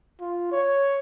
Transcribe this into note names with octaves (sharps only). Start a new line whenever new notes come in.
F4
C#5